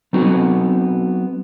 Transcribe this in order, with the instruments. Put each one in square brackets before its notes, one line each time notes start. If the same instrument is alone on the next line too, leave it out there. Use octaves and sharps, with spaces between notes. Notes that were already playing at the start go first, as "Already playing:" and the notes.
[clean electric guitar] F#3 B3 C4 D#4 F#4